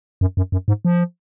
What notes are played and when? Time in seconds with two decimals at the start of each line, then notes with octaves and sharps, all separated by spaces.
0.21 F#2
0.37 F#2
0.52 F#2
0.68 G#2
0.85 F3